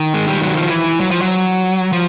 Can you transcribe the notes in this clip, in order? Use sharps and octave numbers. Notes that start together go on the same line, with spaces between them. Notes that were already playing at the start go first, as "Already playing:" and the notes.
Already playing: D#3
G#3
G3
F#3
F3
E3
F#3
F3
F#3
F3